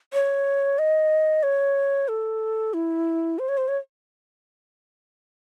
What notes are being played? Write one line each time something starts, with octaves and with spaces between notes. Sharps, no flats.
C#5
D#5
C#5
A4
E4
C5
C#5
C5
C#5